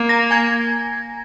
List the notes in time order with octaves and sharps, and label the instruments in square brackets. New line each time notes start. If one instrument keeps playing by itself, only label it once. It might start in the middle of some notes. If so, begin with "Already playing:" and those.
Already playing: [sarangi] A#3
[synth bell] A#5 A#6
G#5 G#6